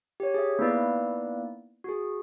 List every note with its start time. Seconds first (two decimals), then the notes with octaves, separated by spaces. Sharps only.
0.20 G4 C#5
0.34 G#4 E5
0.59 A#3 B3 D#4 E4 B4 D5
1.84 F#4 G#4